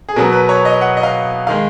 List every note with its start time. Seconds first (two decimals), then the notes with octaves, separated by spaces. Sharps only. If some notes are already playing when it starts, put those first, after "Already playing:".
0.09 G#4
0.16 B2 F#3 B3 A#4
0.32 B4
0.49 C#5
0.65 D#5
0.81 F#5
0.97 D#5
1.03 F5
1.47 D#3 G#3 F5